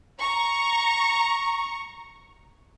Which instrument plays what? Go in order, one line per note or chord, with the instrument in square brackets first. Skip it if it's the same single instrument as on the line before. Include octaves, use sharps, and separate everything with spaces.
[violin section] A#5 C#6